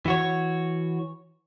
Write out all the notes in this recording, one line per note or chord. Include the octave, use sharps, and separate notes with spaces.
E3 F#4 C#5